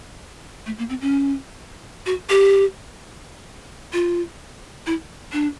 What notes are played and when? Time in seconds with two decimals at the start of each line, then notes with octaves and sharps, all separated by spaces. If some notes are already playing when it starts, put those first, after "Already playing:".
0.66 A3
0.78 A#3
0.89 C4
1.01 C#4
2.06 F#4
2.30 G4
3.93 F4
4.86 E4
5.33 D4